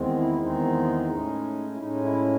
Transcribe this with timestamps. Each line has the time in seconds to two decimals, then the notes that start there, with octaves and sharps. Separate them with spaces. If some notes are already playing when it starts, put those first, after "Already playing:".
Already playing: E2 D#3 G#3 C4
0.17 E4
0.40 E2 D#3 G#3 C4 D#4
1.11 A2 G#3 C#4
1.74 E4
1.79 A2 G#3 C#4 D#4
2.03 E4